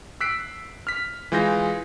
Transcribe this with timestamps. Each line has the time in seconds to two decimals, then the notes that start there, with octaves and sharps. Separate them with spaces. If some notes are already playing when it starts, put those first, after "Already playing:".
0.21 E6 F#6 B6 C7 D7
0.87 F6 B6
1.32 E3 G#3 F4 G6 A#6